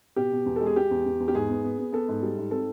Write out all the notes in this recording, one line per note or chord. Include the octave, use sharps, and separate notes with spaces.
B2 G4
B2
E2
G#3 A4
G#4
G#3 G4
E2
E2
E2
G4
G#2 G#4
B3
B3
B3
B3 A4
G#2
G3
G#2
C4 A4